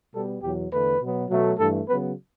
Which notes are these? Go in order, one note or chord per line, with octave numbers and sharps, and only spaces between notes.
B2 G3 B3 A4
E2 B2 F#3 G4
E2 D3 A3 B4
B2 F#3 B3
B2 F#3 A3
G2 E3 A3 A4
C#3 F#3 B3 B4